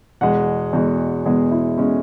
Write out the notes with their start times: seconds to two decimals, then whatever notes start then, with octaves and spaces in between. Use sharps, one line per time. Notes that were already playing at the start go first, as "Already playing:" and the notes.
0.21 E2 B2 G#3 F#5
0.73 E2 B2 G#3
1.25 E2 B2 G#3 G#4
1.51 E4
1.78 B2 G#3 C#4